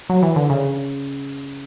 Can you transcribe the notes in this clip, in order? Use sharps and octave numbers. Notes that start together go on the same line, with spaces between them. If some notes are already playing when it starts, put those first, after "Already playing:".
F#3
E3
D3
C#3